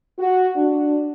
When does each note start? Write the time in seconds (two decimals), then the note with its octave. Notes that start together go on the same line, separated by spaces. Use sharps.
0.19 F#4
0.56 D4